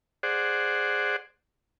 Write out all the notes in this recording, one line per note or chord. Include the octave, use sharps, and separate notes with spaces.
G#4 C5 D5 F#5